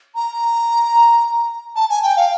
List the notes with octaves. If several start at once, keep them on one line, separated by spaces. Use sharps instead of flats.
A#5
A5
G#5
G5
F5